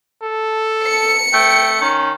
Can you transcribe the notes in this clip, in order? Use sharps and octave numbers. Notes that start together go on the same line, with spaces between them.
A4
C#7
A3 G5
D#3 C#4